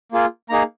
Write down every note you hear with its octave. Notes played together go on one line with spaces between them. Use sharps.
A#3 F4 G#4
A#3 D#4 G#4 A#5